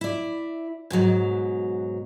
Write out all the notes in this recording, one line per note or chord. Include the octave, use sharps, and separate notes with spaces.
E4 D5
G#2 B2 F#3